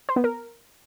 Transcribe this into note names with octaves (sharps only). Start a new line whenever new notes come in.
C5
B3
A#4